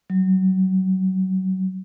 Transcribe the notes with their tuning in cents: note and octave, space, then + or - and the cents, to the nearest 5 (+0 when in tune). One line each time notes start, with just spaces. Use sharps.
F#3 +25